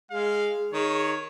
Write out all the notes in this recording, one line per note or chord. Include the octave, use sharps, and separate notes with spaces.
G#3 G#4 F5
D#3 C#5